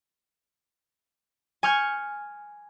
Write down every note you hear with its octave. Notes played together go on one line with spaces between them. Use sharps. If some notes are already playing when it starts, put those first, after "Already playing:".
G#5 C#6 F6 G6 G#6